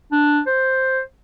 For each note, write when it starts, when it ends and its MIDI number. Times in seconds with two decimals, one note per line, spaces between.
0.12 0.40 62
0.47 1.01 72